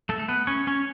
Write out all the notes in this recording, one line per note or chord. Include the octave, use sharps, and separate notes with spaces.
A3 A4
A4
B3 B4
C#4 C#5
C#4 C#5